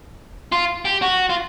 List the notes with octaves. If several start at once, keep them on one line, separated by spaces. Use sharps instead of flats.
F4
G4
F#4
F4